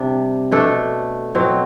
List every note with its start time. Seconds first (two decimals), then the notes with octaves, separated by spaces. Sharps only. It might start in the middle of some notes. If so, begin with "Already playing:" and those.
Already playing: C3 G3 D4
0.51 B2 A3 D4 A4
1.35 B2 F#3 C4